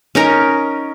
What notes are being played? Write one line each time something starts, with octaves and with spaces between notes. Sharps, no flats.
C#4 D#4 A#4